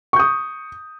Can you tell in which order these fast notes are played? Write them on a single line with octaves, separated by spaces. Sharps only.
C#6 G6 D#6